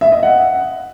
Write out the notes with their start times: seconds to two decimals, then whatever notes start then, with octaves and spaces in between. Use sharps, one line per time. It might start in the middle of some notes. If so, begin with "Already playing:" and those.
0.01 E5
0.12 D#5
0.23 F#5